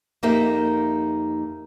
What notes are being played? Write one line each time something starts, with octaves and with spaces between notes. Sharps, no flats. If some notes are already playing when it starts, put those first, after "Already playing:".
F2 A#3 D#4 G4 A#4 E5